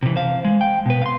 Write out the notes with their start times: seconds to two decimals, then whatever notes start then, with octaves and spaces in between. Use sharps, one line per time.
0.03 C3 E3
0.16 C5 F5
0.45 G#3
0.61 G5
0.86 B2 B4
1.02 F5 C6